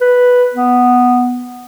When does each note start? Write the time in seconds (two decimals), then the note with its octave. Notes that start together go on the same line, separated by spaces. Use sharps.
0.01 B4
0.54 B3